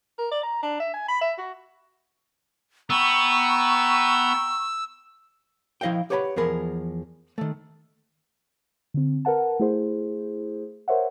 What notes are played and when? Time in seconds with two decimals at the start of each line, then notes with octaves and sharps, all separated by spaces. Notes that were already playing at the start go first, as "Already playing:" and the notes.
0.18 A#4
0.31 D5
0.43 A#5
0.62 D4
0.80 E5
0.93 G#5
1.08 B5
1.21 E5
1.38 F#4
2.90 B3 G5 A#5 C#6 E6
5.81 F3 E4 D#5 F5 G5
6.10 G4 B4 C#5 F#5 A#5 B5
6.36 E2 F3 G#4 A#4 B5
7.38 D#3 A3
8.94 D3 C4
9.25 A#4 B4 F#5 A5
9.60 A3 E4 G#4 C5
10.88 A#4 C5 C#5 E5 F#5